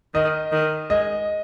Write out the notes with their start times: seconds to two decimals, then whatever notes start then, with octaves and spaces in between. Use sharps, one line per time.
0.14 D#3 D#5
0.52 D#3
0.90 G#3 D#5